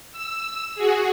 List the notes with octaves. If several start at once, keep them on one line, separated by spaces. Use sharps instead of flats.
E6
F#4 G#4